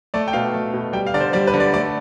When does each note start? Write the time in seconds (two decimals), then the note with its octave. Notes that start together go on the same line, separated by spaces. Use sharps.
0.14 A3 D5
0.28 G5
0.33 B2 F5
0.54 A3
0.74 B2
0.93 G3 G5
1.07 F5
1.14 D3 D5
1.20 C5
1.33 G3 D5
1.47 B4
1.54 D3
1.60 D5
1.73 A3 D5